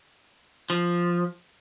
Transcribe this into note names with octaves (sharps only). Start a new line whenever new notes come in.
F3